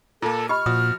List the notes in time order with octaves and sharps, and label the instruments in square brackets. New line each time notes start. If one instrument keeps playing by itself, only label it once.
[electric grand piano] A#2 A#3 [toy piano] F4 [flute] A4
[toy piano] G4 D#5 B5 [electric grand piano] C#6 [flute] F6
[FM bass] A#2 [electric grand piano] F3 F#4 [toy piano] D#6